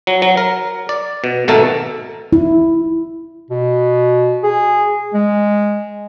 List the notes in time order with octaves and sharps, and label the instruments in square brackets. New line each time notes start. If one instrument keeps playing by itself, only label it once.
[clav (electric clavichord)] F#3
F#3
A#4
D5
B2
G#1 B2 A3 A4 A#4 A5
[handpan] E4
[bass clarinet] B2
G#4
G#3